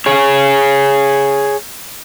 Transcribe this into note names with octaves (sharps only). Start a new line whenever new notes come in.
G#4 C#5